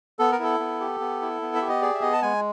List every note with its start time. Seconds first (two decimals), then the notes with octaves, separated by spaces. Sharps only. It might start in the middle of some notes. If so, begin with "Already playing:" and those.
0.19 B3 A4
0.32 A#4
0.39 E4 A4
0.60 B3
0.80 G4
1.00 B3
1.21 E4
1.42 B3
1.55 E5
1.62 G4
1.69 D#5
1.82 G#4 D5
1.94 E5
2.02 B3 D#5
2.13 A5
2.22 G#3 G#5